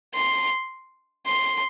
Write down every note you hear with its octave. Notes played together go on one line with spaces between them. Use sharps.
C6
C6